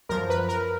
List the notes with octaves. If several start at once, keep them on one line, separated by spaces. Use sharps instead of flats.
F#2 F3 A#4
B4
A#4